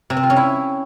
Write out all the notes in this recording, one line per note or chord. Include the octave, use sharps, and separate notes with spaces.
C3
C4
F4
C#4
E4